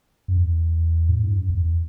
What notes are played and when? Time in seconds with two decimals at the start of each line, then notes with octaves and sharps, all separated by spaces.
0.28 F#2
0.37 E2
1.09 A2
1.23 G2
1.37 F#2
1.50 E2